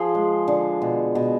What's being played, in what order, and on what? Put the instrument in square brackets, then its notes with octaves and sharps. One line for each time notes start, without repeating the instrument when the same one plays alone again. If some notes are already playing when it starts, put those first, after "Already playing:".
Already playing: [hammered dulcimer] F3 G#4 C5
G#3
D3
B2
B2